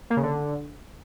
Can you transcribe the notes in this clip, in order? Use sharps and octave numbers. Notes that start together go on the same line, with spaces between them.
A#3
C#3
D3